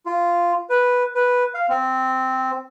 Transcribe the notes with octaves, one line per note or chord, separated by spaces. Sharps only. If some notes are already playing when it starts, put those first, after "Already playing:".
F4
B4
B4
F5
C4